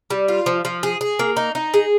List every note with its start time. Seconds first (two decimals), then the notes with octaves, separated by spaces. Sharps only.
0.10 G3
0.28 F4
0.46 F3
0.65 F3
0.83 G#4
1.01 G#4
1.19 A#3
1.36 D#4
1.55 D#4
1.74 G#4